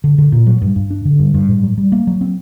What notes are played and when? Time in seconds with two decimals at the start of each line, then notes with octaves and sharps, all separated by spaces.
0.04 D3
0.18 D3
0.32 A#2
0.47 F#3
0.62 G2
0.76 G2
0.91 D4
1.05 D3
1.19 G2
1.34 G2
1.49 A2
1.63 F#3
1.78 G3
1.92 A#3
2.07 F#3
2.21 C4